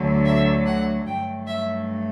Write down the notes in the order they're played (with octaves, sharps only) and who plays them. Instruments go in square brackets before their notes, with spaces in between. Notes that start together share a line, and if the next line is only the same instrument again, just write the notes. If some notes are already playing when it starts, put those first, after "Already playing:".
Already playing: [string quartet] D2 D3 F#3 A3
E5
F#5
G2 F#3 A3 G5
E5